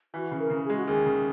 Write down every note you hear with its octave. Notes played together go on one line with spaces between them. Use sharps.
E3 F#4
C#3
A#4
C#3
G#4
G#3
F#4
D#2 G#4
C#3